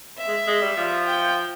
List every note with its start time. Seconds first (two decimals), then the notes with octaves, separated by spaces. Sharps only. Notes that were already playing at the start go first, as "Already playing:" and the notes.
0.18 E5
0.28 G#3
0.47 G#3
0.61 G3
0.77 F3
1.06 G5